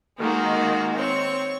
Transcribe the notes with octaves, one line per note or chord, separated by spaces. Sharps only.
D#3 G#3 A#3 F#4
C4 C#5 C#6